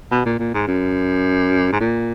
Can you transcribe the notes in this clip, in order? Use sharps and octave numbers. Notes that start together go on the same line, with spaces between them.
B2
A#2
A#2
G#2
F#2
G#2
A#2